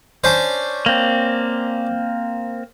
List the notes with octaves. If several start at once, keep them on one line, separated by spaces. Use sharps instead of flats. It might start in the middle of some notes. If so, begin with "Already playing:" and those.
C#4 D4 C5
A#3 C4